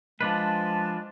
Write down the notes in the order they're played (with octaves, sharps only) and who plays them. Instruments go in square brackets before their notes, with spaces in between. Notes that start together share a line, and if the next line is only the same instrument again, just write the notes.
[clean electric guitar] F3 D4 B4 [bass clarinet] G#3 [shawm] A5